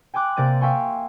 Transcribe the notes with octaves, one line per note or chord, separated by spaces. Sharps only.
G5 G#5 C6 D6 F#6
C3 A#3 D5 G6 D#7
E5 F5 G5 G#5 C6 C#6